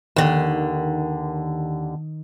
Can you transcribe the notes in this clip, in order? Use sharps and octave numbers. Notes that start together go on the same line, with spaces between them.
D#2 D3 D#3